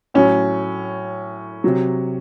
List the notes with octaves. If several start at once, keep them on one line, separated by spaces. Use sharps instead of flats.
A2 F#3 C#4
C3 F#3